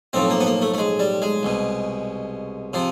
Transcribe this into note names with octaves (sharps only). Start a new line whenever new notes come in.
B1 A2 F3 C4
A#3
B3
A#3
A3
A3
G#3
G3
G#3
C2 B2
C3 F3